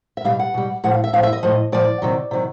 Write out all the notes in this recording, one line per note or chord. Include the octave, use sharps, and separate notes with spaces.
E5
B2 G3 F5
F#5
B2 G3
A2 F3 F#5
F5
E5
A2 F3 F5
E5
D#5
A2 F3
A2 F3 D5
C3 D#3 F#3
C3 D#3 F#3